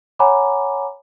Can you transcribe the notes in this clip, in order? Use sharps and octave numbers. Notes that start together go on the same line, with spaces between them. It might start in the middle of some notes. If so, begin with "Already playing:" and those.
C#5 F#5 G#5 A#5 B5 D6